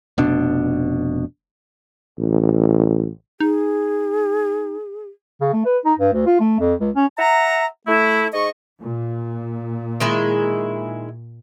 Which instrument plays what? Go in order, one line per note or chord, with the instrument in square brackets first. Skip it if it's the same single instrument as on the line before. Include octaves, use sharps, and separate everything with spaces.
[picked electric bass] F1 B2 D4
[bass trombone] A1
[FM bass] D#4 [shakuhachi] G#4
[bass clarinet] C#3
A3
B4
D#4
G2
D2
F4
A3
F2
C#2
C#4
[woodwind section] E5 F#5 A#5
A3 E4
G#2 D#5 C#6
[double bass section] A#2
[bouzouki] D#3 G#3 E4